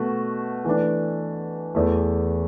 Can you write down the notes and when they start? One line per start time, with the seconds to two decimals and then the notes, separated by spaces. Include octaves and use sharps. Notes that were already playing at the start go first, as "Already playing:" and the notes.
Already playing: B2 A3 F#4
0.65 E3 A3 D4
1.75 E2 E3 A3